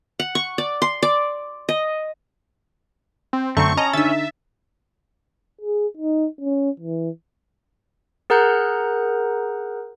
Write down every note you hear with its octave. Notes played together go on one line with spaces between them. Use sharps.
F#5
C#6
D5
C6
D5
D#5
C4
F#2 D3 A3 C4 A#5 C#6
C#4 D#5 A5 A#5
D3 D#4 E5 E6 A6
G#4
D#4
C#4
E3
G#4 A#4 F#5 A#5 F#6 G6